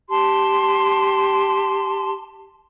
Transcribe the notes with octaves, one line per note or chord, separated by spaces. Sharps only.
G4 A5 C6